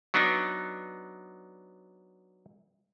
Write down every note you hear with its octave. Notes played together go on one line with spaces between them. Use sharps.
F#3 B3 D4 D#4